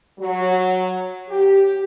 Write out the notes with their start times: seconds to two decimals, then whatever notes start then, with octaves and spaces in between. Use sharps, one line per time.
0.19 F#3
1.29 G4